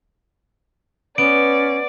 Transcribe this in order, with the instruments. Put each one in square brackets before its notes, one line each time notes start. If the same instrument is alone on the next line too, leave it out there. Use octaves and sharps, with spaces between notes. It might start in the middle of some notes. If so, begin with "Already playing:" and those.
[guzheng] B3 [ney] C#4 [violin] D5 [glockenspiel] D7